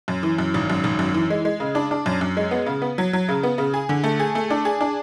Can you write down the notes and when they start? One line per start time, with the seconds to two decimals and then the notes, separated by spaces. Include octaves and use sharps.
0.08 F#2
0.23 E3
0.38 F#2
0.54 G#1
0.70 F#2
0.84 G#1
0.99 F#2
1.14 E3
1.30 G#3
1.45 G#3
1.60 C#3
1.75 D4
1.91 D4
2.06 F#2
2.21 F#2
2.37 G#3
2.51 B3
2.66 C#3
2.82 B3
2.98 F#3
3.13 F#3
3.29 C#3
3.43 B3
3.58 C#3
3.74 G#4
3.89 D3
4.04 A3
4.19 G#4
4.35 A3
4.50 D4
4.65 G#4
4.81 D4